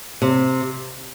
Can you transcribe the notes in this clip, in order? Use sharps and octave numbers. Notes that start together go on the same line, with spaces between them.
C3